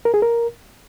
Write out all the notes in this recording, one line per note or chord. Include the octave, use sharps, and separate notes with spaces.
A#4
G#4
A#4